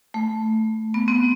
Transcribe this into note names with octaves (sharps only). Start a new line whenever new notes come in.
A3
B3
C4